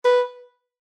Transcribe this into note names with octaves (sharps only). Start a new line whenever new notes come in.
B4